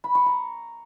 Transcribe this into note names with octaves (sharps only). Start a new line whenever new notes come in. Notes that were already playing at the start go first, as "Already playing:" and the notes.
B5
C#6
A#5